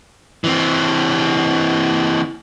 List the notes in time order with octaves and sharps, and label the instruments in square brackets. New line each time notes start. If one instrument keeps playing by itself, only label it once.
[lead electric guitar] E3 C4